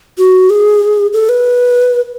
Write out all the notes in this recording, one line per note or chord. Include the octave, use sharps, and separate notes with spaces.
F#4
G#4
A4
B4